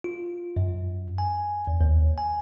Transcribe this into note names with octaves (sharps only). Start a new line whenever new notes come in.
F4
F#2
G#5
E2
D#2
G#5